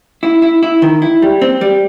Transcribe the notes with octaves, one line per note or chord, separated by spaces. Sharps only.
E4
E4
E4
D#3
E4
G3
C4
G3